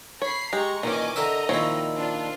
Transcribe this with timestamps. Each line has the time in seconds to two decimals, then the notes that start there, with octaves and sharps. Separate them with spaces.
0.22 C#5 B5 C7
0.53 G#3 G4 A#5 C#6
0.83 A#2 D#3 E3 C#4 D#5 G#5 D6
1.16 D3 A#4 D#5 E5 A#5
1.49 A#2 D#3 F3 C4 E4 C#5
1.97 D4 F4